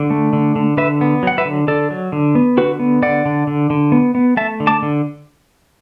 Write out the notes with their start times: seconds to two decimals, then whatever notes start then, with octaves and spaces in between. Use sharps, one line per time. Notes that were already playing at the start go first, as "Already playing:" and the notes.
Already playing: D3
0.10 A3
0.33 D3
0.56 D3
0.77 D3 B4 E5
1.01 B3
1.23 F#3 F#5
1.38 B4 E5
1.45 D3
1.68 D3 A4 D5
1.90 F#3
2.12 D3
2.35 B3
2.57 D3 F#4 B4
2.80 B3
3.02 D3 D5 F#5
3.26 D3
3.47 D3
3.70 D3
3.92 B3
4.15 B3
4.37 A3 E5 A5
4.60 D3
4.67 A5 D6
4.83 D3